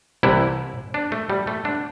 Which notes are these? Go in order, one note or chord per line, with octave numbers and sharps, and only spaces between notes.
C2 C3 E3 E4
D4
A3
G3
A3
D3 D4